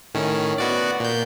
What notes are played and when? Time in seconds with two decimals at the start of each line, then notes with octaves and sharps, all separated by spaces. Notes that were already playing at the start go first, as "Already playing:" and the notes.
0.14 A2 D#3 C#4
0.58 B3 F#4 D5
1.00 A#2 G6